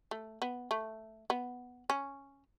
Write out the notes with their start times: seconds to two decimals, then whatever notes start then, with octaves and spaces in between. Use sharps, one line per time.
0.11 A3
0.42 B3
0.71 A3
1.30 B3
1.90 C#4